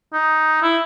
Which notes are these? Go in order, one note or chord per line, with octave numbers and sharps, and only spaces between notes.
D#4
E4